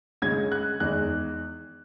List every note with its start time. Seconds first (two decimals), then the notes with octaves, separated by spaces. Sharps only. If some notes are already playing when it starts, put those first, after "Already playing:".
0.22 C#3 G#3 C#4 G#6
0.52 F#6
0.80 E2 D#3 G#3 F#6